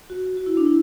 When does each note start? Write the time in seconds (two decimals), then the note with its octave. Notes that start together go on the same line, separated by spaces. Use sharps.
0.10 F#4
0.37 F#4
0.46 E4
0.57 D4
0.67 E4